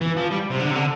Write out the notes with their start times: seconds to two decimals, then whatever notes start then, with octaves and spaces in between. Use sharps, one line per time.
0.01 E3
0.17 F3
0.31 G3
0.50 C3
0.59 D3
0.70 C3
0.75 D3